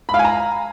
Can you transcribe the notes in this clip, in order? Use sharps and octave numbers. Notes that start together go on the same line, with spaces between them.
B5
F5
G#5
A#5